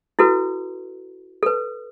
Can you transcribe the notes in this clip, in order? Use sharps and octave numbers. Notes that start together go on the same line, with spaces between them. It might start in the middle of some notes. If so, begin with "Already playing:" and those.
E4 F#4 A4 B4
A4 B4